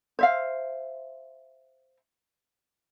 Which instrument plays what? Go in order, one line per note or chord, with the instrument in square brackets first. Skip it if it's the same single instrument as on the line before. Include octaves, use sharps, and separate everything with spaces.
[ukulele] C5 E5 F5